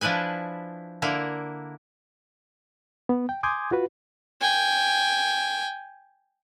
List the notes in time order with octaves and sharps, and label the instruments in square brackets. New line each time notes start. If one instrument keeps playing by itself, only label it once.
[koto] F3 D4 E4 B4 G#5
D3 A#3 E4 A#4
[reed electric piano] B3
G5
G#5 C6 D6 D#6 G6 G#6
F4 F#4 B4
[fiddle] G5 G#5